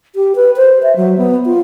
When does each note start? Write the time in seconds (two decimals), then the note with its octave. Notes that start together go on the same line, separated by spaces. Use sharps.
0.15 G4
0.36 B4
0.57 C5
0.83 E5
0.96 F#3
1.18 B3
1.46 F4